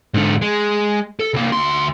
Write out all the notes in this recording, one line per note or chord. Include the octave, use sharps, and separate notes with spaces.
G#2 D3
G#3
A4
C2 A#3
D2 C6